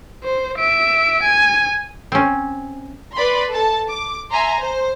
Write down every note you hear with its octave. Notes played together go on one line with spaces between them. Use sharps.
C5
E5 D7
G#5
C4 C#4
B4 D5 B5 C6
A4 A5
D6
E5 G#5 A#5 C6
C5